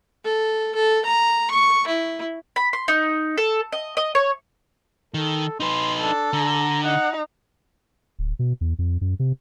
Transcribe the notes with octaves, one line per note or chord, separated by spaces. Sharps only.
A4
A4
A#5
C#6
E4
B5
C6
D#4
A4
D#5
D#5
C#5
D#3 A4
D#4 B4 C6
D4 A4
D3 A#5
D#4 F#5
D1
B2
E2
F2
F#2
C3